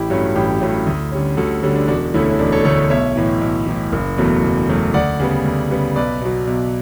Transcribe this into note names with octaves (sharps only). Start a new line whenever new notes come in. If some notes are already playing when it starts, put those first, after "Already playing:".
Already playing: A1 E4 G4
G2 F#3 A3 C#4
A1 E4 G4
G2 F#3 A3 C#4
D2
D3 G3 C#4
D2 F#4 A4
D3 G3 C#4
D4
E1 D4 F#4
D2 D3 A3 C#4 E4
C#4
E1 D4
A4 C#5
D2 D3 A3 A4 C#5
B1 C#5 E5
A2 E3
B1
A2 E3
F#1
E2 B2 F#3 A3
F#1
E2 B2 F#3 A3
D2 D5 F#5
C#3 G3 B3
D2
C#3 G3 B3
B1 B4 D5
B2 F#3
B1